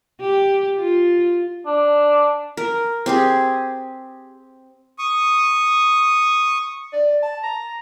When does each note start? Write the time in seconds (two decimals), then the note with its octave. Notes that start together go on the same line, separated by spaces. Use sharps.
0.21 G4
0.79 F4
1.66 D4
2.57 A#4
3.06 C4 G4 G#4
4.99 C#6 D#6
6.93 D5
7.22 A5
7.43 A#5